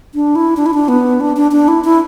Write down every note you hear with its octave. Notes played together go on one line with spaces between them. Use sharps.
D4
E4
D4
E4
D4
B3
D4
D4
D4
E4
E4